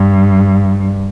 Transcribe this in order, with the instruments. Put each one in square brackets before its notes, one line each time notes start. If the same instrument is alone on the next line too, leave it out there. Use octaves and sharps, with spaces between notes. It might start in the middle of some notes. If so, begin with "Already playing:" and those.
Already playing: [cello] G2